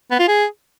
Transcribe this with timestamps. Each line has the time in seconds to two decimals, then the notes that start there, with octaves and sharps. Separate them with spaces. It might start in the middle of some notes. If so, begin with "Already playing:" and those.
0.11 B3
0.19 F4
0.28 G#4